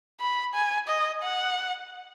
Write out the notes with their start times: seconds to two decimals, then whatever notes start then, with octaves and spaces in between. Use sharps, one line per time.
0.21 B5
0.54 G#5
0.88 D#5
1.23 F#5